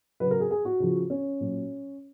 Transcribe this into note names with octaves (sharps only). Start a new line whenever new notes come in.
C#3 F#3 B4
A#4
G#4
G#4
F#4
C#3 F3
C#4
A#2 F#3